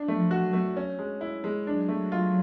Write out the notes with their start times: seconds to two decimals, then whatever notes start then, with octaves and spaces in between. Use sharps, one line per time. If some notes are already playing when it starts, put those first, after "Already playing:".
Already playing: D4
0.08 A3
0.16 F3
0.31 F#4
0.46 F#3
0.53 A3
0.77 C#4
0.99 G#3
1.21 E4
1.44 G#3
1.67 F#3 D4
1.89 A3
2.12 F4